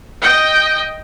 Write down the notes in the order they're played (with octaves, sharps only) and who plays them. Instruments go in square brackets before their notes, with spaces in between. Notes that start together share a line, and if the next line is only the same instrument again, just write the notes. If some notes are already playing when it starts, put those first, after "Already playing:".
[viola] D#5 G5